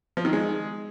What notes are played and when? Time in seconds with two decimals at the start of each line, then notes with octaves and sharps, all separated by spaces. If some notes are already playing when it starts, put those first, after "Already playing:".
0.17 F3
0.25 D#3
0.33 G#3